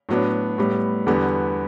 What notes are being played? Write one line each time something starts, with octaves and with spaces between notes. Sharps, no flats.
A2 F#3 B3 D4
A2 G3 B3
E2 D3 G3 B3